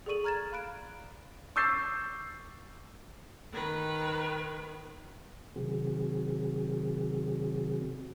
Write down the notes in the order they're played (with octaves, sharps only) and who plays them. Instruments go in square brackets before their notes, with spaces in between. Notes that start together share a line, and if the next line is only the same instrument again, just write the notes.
[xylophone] G#4 A4 D5 C#6 D#7 F#7
A#5 F6 G#6 A6 E7
F5 B5 F#6 D7
[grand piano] C#6 D6 E6 G6 A6 C7
[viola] D#3 B4
[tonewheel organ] C3 D#3 F#3 C4 F#4 G#4